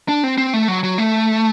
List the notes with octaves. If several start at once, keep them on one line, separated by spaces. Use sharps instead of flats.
D4
C4
C4
A3
F#3
F#3
A3